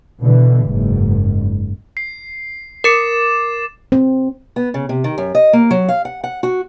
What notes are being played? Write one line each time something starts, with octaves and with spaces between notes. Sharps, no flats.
B2 D3 E3
F#1 G#2
C7
A#4 D6 A6 C#7 E7
C4
B3
C#3
C3
D#3
F#2
D#5
A#3
F#3
F5
F#5
F#5
F#4